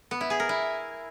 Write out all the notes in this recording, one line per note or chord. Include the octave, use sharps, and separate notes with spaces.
B3
E4
G#4
A#4
E4